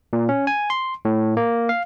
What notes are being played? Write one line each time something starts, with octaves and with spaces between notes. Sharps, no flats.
A#2
C#4
G#5
C6
A2
A#3
F5